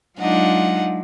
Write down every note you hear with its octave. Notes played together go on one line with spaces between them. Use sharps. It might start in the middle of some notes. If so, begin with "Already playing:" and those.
F#3 G#3 D4 D#4 F4 F#5